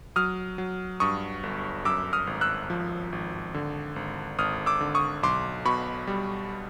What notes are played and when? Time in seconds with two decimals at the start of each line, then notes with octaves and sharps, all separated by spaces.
0.16 F#3 D#6 F6
0.58 F#3
1.00 G2 C#6 D#6
1.43 G1
1.85 F#2 D6 E6
2.13 D#6 F6
2.27 G#1
2.41 E6 F#6
2.70 F3
3.12 G#1
3.54 D3
3.96 G#1
4.38 G#1 D#6 F6
4.66 D6 E6
4.80 D3
4.95 C#6 D#6
5.23 B1 C6 D6
5.65 B2 B5 C#6
6.07 G3